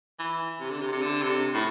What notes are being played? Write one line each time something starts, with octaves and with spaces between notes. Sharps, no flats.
E3
C3
D3
C3
C3
D3
C3
A2